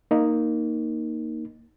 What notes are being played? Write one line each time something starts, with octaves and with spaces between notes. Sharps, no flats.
A#3 D#4